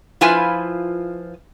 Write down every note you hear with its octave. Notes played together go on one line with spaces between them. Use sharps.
F3 E4 F4 B4 G#5